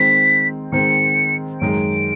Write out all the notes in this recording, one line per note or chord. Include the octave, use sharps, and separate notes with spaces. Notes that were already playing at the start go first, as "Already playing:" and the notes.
Already playing: D#3 G#3 C4 B6
D#3 G#3 C4 C#7
F#2 D#3 G#3 D7